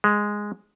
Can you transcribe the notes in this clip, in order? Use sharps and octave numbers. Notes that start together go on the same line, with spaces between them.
G#3